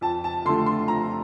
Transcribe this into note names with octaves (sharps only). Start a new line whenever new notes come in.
F2 A5
A5
D3 F3 A3 C6
C6
F2 A#5